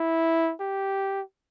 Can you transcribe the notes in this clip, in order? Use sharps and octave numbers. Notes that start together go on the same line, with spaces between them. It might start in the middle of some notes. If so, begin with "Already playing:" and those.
Already playing: E4
G4